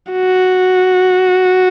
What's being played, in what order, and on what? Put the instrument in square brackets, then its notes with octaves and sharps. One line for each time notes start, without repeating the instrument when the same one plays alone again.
[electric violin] F#4